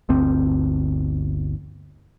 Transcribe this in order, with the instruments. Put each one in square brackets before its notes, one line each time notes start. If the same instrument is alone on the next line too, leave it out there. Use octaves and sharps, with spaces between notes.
[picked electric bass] G1 D2 C4